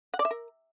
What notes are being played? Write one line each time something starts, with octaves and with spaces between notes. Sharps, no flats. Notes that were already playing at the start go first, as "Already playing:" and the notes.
F#5
D5
E5
A#4